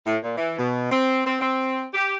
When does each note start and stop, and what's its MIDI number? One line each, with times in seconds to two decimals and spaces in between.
0.06 0.16 45
0.23 0.34 46
0.37 0.56 52
0.58 0.88 47
0.91 1.22 60
1.26 1.38 60
1.40 1.86 60
1.94 2.17 67